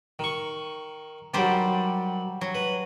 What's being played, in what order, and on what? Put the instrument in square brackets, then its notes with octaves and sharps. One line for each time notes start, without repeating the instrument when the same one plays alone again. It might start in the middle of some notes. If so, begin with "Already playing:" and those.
[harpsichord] D#3 C#6
[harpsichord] D#3 F#3 [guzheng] G3 C5 D5
[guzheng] F#3
[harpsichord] B4